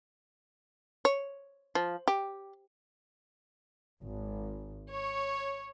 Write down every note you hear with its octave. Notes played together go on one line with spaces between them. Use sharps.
C#5
F3
G4
G#1
C#5